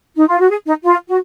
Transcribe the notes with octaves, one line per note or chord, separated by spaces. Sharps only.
D#4
F4
F#4
G#4
D#4
F4
F#4